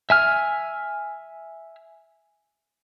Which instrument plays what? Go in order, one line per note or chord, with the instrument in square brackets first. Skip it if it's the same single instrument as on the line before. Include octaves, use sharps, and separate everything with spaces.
[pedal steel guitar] E5 G#5 F6